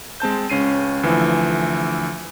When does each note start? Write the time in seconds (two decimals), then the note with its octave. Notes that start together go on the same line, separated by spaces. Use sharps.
0.20 G#3 C4 A5 G6
0.50 C#2 C#4 C7 D#7
1.03 D2 E3 F3